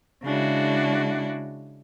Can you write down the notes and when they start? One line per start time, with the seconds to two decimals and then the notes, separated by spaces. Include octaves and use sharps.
0.23 C#3 G#3 D4 E4 F#4